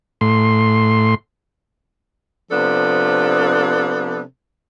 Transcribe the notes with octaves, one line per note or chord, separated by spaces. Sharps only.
A2 C6
C3 F3 B3 D4 A4